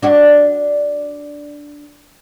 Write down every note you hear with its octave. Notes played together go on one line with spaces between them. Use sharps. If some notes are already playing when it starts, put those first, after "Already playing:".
D4 F#4 D5